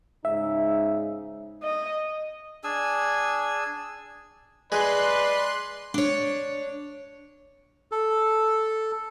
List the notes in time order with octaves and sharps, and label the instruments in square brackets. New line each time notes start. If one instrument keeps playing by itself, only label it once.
[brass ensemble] G#2 C#3 D#4 [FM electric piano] E5
[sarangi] D#5
[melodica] D4 G#4 G#5 E6
[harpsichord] G#3 [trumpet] B4 [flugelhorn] D5 [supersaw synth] C6 F#6
[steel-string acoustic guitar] D4 C#5
[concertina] A4